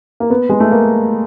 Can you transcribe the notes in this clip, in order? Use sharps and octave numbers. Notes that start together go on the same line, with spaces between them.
A#3
B3
G#3
A3
A#3